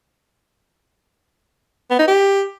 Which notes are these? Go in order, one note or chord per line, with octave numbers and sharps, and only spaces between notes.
B3
D#4
G4